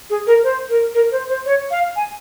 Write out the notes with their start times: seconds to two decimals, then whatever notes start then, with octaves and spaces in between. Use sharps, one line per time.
0.10 G#4
0.27 A#4
0.43 C5
0.69 A#4
0.95 A#4
1.11 C5
1.28 C5
1.46 C#5
1.71 F5
1.96 G#5